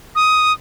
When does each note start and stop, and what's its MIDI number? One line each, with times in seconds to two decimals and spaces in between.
0.15 0.53 87